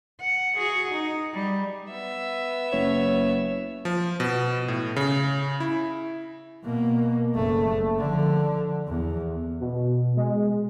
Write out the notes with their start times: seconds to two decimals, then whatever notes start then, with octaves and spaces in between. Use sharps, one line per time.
0.21 F#5
0.57 F#4 G#4
0.92 D#4
1.34 G3
1.91 B3 E5
2.72 F#1 C#5
3.85 F3
4.20 B2
4.68 A2
4.96 C#3
5.60 E4
6.64 B2 A#3
7.35 F#1 A3
7.99 D3 F3
8.87 E2
9.60 B2
10.17 G#3